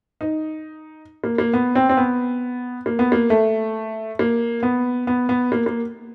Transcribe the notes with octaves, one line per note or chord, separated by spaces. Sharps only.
D#4
A#3
A#3
B3
C4
C4
B3
A#3
B3
A#3
A3
A#3
B3
B3
B3
A#3
A#3